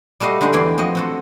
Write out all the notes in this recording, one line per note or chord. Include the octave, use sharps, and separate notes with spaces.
G3 A3 F#4 D#5 F5
D3 G#3 A3 D#4
E2 E3 G5 C6
F3 C4 F#4 D#5
C4 F#4 A4